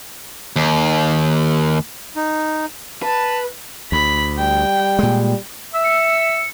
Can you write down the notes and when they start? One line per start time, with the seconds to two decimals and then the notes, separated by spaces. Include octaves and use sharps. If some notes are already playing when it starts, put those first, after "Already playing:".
0.56 D#2
2.16 D#4
3.02 B4 A5
3.92 D2 B5
4.38 G3 G5
4.99 A#2 G#3
5.73 E5 E6
5.84 C#7